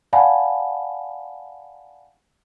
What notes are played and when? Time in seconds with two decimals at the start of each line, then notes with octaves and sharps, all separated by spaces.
0.13 D5 F5 F#5 G#5 A5 B5